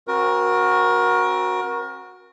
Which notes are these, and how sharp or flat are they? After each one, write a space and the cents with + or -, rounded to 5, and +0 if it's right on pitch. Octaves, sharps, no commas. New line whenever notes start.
C4 +40 F#4 -10 A#4 +25